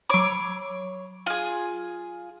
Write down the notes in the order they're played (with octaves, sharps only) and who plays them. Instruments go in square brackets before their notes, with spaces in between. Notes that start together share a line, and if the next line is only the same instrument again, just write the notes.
[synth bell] F#3 B5 [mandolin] C#5 D6
[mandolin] F4 G#4